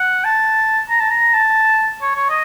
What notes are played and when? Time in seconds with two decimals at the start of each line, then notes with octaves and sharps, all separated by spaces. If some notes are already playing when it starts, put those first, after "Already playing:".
Already playing: F#5
0.24 A5
0.89 A#5
1.00 A5
1.10 A#5
1.33 A5
2.02 C#5
2.15 C#5
2.29 D#5